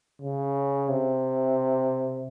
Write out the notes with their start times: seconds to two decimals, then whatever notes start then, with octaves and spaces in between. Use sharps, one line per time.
0.21 C#3
0.89 C3